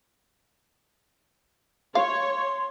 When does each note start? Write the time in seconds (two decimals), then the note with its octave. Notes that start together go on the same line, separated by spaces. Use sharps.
1.95 C#5 F5 C6